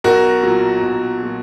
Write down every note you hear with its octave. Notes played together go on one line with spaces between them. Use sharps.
B1 F#4 A#4
A#2 F#3
B1
A#2 F#3